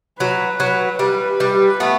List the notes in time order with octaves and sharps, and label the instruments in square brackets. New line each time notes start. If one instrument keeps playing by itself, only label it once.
[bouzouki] F#3 [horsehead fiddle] B4
[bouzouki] F#3
[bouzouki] G3 [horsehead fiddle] B4
[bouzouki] G3
A3 B3